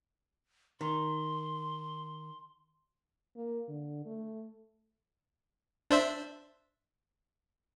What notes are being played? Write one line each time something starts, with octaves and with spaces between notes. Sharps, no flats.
D#3 C6
A#3
D3
A3
D4 C5 E5